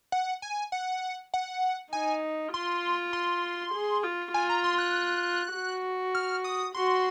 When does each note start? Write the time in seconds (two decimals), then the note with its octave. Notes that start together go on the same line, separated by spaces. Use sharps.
0.12 F#5
0.42 G#5
0.72 F#5
1.34 F#5
1.93 D#4 G#5
2.54 F4 C6
3.13 C6
3.74 G#4
4.03 F4
4.34 F4 G#5
4.49 A#5
4.64 C6
4.78 F#6
5.54 F#4
6.15 F6
6.44 D#6
6.74 F#4 C6